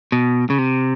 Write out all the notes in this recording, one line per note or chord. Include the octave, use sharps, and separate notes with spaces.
B2
C#3
C3